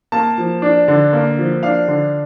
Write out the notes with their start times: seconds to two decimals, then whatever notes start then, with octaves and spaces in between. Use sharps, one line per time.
0.12 A#3 A5
0.38 F3
0.62 D4
0.88 D3
1.13 A#3
1.38 F3
1.63 D4 F5
1.88 D3